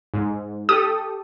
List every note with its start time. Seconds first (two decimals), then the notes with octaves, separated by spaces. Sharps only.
0.14 G#2
0.69 G4 A4 D#6